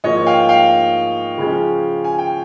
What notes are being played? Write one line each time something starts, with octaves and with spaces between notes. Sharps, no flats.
G#2 F3 A#3 D#4 C#5 D#5
F5 G5
F5 G5
C#3 F3 G#3 C#4
G#5
G5